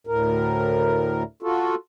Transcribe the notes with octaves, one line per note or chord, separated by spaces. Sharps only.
D2 A2 A#4
F4 F#4 A4